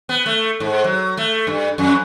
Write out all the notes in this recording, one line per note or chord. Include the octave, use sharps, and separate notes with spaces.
B3
A3
G#2
F#3
A3
G2
F2